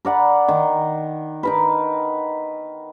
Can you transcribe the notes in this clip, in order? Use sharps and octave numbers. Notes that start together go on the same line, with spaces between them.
A#4 D5 F#5 B5
D#3
D#4 A#4 B4